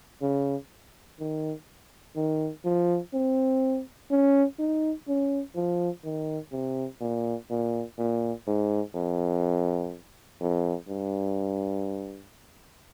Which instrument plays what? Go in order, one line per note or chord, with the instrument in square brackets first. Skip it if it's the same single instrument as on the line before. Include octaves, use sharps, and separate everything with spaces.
[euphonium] C#3
D#3
D#3
F3
C4
C#4
D#4
C#4
F3
D#3
C3
A#2
A#2
A#2
G#2
F2
F2
G2